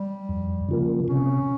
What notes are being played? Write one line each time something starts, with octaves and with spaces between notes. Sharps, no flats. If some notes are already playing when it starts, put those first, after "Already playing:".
Already playing: G3
F2
C#3 F3 A#3
C3 C#4